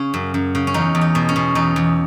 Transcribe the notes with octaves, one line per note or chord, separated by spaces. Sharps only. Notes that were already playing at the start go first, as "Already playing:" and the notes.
Already playing: C#3 C#4
F#2
F#2
C#3
C#4
E2 D#4
E2
D#4
B2
C#4
B2
E2 D#4
E2